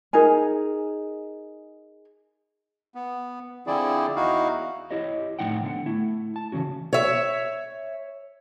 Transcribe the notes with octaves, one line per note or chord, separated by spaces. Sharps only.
D#4 G#4 A#4 G#5
B3
D3 F3 C4 E4 G#4 D5
E2 D#4 E4 F#4 F5
E4 G4 C#5 D#5
A2 F3 D#4 F#5 G5
D3 B3 F5 F#5
A3 E4
A5
C#3 E3 C#4 F#4
C#5 E5